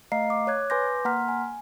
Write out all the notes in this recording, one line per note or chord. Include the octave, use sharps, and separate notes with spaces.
A3 D#5 F5 A#5 C7
D6
C#5 F#6 G#6
B4 G#5 C6 D6 G6 A#6
A#3 F#5 A#5 C6 F6 B6
G#5